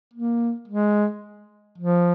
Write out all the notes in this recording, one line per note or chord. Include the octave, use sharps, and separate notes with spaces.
A#3
G#3
F3